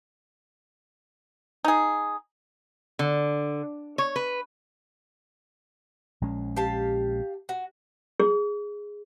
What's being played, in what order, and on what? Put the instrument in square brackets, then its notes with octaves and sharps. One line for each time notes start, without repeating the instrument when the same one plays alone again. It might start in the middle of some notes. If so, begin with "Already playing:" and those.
[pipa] D#4 G#4
[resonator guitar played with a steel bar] D3
C#5
B4
[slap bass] A#1 G#3 C#4
[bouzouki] G4 F5 A5
F#4
[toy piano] G#4